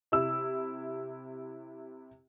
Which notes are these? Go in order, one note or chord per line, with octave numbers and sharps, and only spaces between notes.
C3 E4 E6